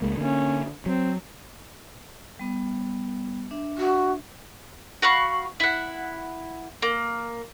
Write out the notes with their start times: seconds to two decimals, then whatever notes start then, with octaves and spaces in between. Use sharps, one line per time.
0.02 C#2 G#3 A#3
0.17 D3 A#3 C#4
0.86 F#3 C4
2.39 G3 B3
3.51 D4 E5
3.78 F#4
5.02 F#4 F5 B5 C#6
5.60 E4 F#5
6.82 A#3